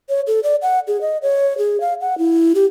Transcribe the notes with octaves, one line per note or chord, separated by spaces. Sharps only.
C#5
A4
D5
F#5
G#4
D#5
C#5
G#4
F5
F#5
E4
G4